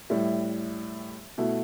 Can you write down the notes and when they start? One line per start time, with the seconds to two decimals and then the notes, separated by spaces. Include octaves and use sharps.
0.10 A2 G3 E4
1.38 B2 A3 E4